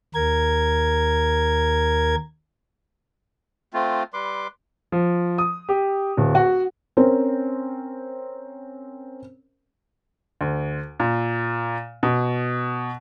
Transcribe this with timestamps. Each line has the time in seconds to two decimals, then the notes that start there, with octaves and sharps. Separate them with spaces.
0.15 D#2 A#4 G#6
3.74 A3 C4 F4
4.14 G3 B4 C6 D6
4.92 F3
5.38 D#6
5.69 G4
6.17 D1
6.35 F#4
6.97 C4 C#4 A#4 C5
10.41 D2
11.00 A#2
12.03 B2